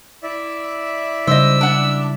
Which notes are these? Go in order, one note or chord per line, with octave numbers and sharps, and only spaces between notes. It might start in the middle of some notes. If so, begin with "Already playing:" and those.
E4 D5 E5
C#3 G3 D#4 C5 D#5 E6
D4 F#5